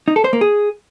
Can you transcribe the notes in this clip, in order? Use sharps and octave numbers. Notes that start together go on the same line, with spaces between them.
D#4
A4
C5
A#3
G#4